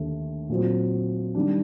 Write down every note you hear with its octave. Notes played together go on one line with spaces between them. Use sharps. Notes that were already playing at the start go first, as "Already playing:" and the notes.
Already playing: D#2 D3 A3
A#2 F#3 C4
D#3 G3 D4